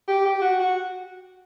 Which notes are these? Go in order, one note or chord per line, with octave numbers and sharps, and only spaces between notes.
G4
G4
F#4
F#4